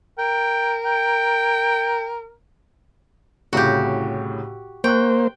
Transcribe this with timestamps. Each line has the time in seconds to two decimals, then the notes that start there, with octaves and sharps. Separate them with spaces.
0.18 A#4 G5
0.85 G5
3.53 C2 A2 C#3 F#4 G4
4.84 A#3 C5 G5 C#6 F#6